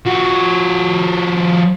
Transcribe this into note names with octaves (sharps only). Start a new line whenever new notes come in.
F3 F#4